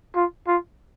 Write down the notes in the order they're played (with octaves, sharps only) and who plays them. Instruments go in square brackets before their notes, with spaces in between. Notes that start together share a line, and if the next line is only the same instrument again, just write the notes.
[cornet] F4
F4